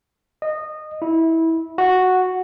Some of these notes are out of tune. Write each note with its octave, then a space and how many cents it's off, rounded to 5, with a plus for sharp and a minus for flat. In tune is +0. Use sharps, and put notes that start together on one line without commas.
D#5 -20
E4 -20
F#4 -5